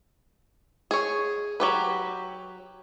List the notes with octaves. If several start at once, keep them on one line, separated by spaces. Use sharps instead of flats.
G#4 C#5
F#3 G4 B4